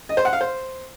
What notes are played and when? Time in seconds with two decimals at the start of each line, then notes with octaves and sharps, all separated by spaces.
0.09 D#5
0.17 C5
0.25 F#5
0.33 F5
0.41 C5